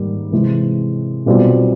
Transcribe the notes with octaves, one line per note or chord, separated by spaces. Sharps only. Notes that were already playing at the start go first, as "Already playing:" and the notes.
Already playing: G#2 D#3 G3 A#3
C3 E3 G#3 C4
B1 B2 G3 C4 F4